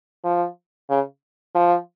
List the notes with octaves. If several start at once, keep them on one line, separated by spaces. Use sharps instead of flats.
F3
C#3
F3